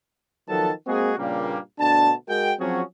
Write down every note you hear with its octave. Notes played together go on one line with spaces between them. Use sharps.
D#3 F3 F#3 B3 A4 A5
G#3 A#3 C4 F#4 G#4
G2 A#2 C#3 G3 A#3
D2 B2 D4 A5
G#3 F#4 A#4 G5
F3 F#3 C4 C#4 F#4 G#4